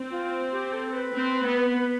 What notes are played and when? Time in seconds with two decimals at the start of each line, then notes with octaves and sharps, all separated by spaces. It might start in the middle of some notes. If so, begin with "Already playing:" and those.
Already playing: C4
0.11 F4
0.52 G4
0.73 A4
0.93 B4
1.13 C4
1.44 B3